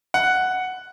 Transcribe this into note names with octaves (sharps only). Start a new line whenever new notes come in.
F#5